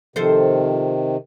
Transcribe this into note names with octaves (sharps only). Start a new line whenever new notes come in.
C3 D#3 F3 A4 C5